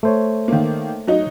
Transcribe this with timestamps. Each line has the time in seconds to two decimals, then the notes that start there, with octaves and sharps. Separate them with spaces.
0.03 A3 C5 C#5
0.48 D#3 A#3
1.07 F#3 D#4